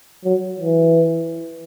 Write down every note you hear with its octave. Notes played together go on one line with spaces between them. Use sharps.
F#3
E3